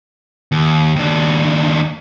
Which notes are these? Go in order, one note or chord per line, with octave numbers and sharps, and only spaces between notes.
D#2
D#2 D4